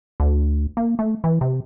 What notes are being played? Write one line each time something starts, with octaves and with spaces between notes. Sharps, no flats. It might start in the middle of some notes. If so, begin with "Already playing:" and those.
D2
A#3
A3
E3
C3